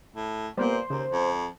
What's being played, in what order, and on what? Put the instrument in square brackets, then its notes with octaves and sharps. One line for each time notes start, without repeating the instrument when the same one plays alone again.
[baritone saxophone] A2
[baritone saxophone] A#2 [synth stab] G3 A#3 B3 [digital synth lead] C5
[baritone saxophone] D#2 [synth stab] C#3
[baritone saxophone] F2